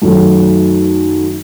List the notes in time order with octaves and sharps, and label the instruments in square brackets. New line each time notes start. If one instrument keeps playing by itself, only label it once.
[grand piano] F#2 D#3 F#3 A3